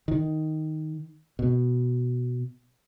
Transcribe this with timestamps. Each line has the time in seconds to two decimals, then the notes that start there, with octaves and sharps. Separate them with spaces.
0.08 D#3
1.39 B2